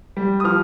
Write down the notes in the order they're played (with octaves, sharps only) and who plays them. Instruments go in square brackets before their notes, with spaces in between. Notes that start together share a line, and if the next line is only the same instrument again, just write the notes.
[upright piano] G3
D#6
F3 F6